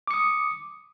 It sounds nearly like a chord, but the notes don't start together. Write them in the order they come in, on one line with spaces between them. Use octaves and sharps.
D6 C#7 D#6